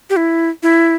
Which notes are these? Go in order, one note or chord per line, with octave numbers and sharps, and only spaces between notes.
G4
E4
E4